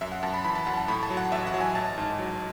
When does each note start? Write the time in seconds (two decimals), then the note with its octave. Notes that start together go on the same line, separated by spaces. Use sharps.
0.01 F#2 E5
0.12 F#5
0.23 F#2 A5
0.34 B5
0.44 E3 B5
0.55 A5
0.66 F#2 F#5
0.77 A5
0.88 A2 B5
1.03 A5
1.10 F#3
1.17 F#5
1.32 A1 E5
1.47 F#5
1.54 F#3
1.60 G#5
1.75 A1 A5
1.98 G#2
2.19 F#3